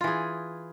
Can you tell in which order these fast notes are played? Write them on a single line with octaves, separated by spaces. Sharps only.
F4 E3 G#4